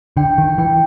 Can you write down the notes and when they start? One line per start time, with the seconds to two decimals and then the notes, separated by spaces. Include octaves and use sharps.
0.17 D3 G5
0.38 D#3
0.58 E3 G5